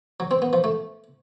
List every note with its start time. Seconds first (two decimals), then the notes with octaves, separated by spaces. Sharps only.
0.20 F#3
0.31 C4
0.42 B3
0.53 F3
0.64 A3